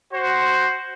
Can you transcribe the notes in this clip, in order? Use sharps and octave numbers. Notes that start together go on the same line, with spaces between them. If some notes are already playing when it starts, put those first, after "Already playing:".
F#4 C5